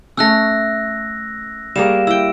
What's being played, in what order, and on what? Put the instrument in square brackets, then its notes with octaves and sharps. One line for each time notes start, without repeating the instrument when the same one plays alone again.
[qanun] A3 C#4 [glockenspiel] E6 F#6 A#6
[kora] G3 A#3 [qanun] G#4 C#5 F5 [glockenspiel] E7
[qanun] E4 G5 [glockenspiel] E6 D7